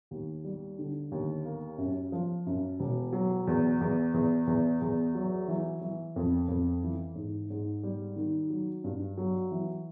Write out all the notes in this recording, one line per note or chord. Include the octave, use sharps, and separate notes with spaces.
D#2
G3
D3
D#2
A#3
F#2
F3
F#2
E1
F#3
E2
E2
E2
E2
E2
F#3
E3
E3
F2
F2
E3
G#2
G#2
G3
D#3
F#3
G2
F#3
E3